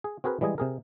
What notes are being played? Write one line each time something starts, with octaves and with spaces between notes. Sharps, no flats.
G#4
C4 F#4 G#4 A#4 B4
E3 G3 G#3 D#5 G#5
C3 G#4 A#4